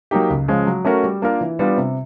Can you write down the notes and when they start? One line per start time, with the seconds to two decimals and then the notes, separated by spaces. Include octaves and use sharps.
0.11 F#3 A#3 D#4 G4
0.30 C#2
0.48 C#3 F3 G#3 C#4
0.67 F#3
0.85 A3 C#4 F#4 A#4
1.04 G3
1.22 A#3 D4 F4 A#4
1.41 E3
1.59 G3 B3 D4 F4
1.77 C3